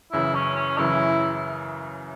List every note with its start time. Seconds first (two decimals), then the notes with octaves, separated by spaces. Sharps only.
0.12 F#2 C#3 E3 E4
0.35 C#4
0.56 C#4
0.78 F#2 C#3 E3 E4